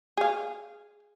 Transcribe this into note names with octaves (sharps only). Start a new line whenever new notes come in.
G#4 F5